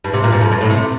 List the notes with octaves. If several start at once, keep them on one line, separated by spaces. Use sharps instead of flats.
G2
C3
A#2
G2
F2
G2
A2
C3